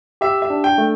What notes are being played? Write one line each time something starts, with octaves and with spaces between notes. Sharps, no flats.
G4 E5
E5
D4
G5
A3